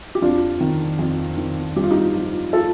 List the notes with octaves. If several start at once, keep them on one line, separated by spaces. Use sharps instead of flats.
G4
F2 D4 F4
D#3
F2
D#3
G2 G4
F4
D#4 G4
F3
F4 A4